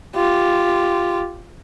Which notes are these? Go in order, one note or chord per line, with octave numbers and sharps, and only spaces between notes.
F4 G4